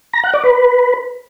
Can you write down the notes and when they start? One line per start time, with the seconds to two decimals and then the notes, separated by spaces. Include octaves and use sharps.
0.13 A#5
0.24 F#5
0.34 D5
0.44 B4